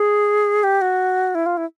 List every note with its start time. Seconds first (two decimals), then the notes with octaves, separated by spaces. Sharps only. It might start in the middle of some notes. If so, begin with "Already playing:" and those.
Already playing: G#4
0.64 G4
0.81 F#4
1.35 E4
1.46 F4
1.57 E4